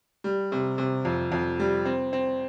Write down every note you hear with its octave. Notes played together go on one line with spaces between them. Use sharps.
G3
C3
C3
F2
F2
G3
C4
C4